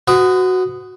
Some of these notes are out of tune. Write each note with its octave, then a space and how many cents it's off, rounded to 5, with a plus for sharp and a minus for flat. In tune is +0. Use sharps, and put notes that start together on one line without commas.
F#4 +0 B4 +45 D#6 -5